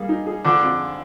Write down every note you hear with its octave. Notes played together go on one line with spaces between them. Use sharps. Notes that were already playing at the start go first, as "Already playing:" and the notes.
Already playing: G3 A#3 G#4
D#4
G#4
D3 F3 D4
F2